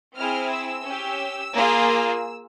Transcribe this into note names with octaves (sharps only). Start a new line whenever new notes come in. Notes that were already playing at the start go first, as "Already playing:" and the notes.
C4 E4 G#4 F6
E6
C#4 G4
A#3 F4 G#4